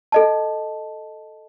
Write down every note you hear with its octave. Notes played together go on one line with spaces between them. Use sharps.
A4 D#5 A5